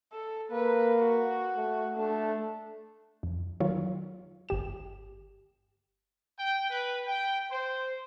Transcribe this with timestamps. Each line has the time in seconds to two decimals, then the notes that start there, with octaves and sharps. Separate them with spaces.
0.13 A4
0.52 A#3 B4
1.00 F#4
1.57 A3
1.98 A3 D4
3.23 F2
3.60 D#3 F#3 F4 C#5
4.49 G1 G4 E7
6.39 G5
6.70 B4
7.07 G5
7.50 C5